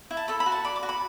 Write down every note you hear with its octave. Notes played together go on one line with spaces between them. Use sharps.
E4
A5
A4 B5
B5
F#4
A5
D5 B5
D6
F#4
B5